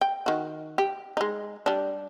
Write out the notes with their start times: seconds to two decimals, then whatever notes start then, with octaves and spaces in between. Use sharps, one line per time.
0.01 G5
0.26 D#3 F#4
0.78 G4
1.17 G#3 D#4
1.66 G3 D4